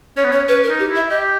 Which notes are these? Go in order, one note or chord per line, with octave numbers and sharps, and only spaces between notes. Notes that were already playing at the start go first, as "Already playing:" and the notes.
C#4 C#5
B3
C#4 C#5
C#4 B4
A#4
D#4
G4
E4
E5
G4 D#5